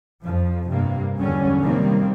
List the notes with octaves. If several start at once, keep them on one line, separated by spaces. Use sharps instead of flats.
F2 F3
G2 C3 A#3
E2 D3 F#3 G3 C#4
C3 D#3 G3 A#3 C4